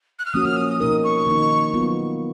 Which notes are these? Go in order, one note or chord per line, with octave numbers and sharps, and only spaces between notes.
F#6
F6
F3 A#3 C#4 F#4 D#6
F6
D#6
D#6
B2 A#3 D#4 A#4 D#6
C#6
D#3 A#3 D#4
D#3 F#3 B3 F4